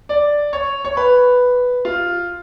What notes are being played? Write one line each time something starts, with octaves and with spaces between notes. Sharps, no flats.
D5
C#5
C#5
B4
F4